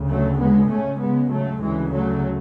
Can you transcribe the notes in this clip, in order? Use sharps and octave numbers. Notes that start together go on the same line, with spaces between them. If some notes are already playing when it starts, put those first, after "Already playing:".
Already playing: D2 C#3
F#3 A3
G#3 B3
C#2 C#3 A3 C#4
G#3 B3
F#3 A3
D2 C#3 E3 G#3
F#3 A3